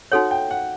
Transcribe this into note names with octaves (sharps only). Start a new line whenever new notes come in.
D#4 F#4 A4 C#5 F#5
G5
F#5